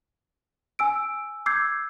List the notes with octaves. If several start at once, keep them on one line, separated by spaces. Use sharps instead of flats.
G#5 E6 D7
D6 E6 G6 G#6 C7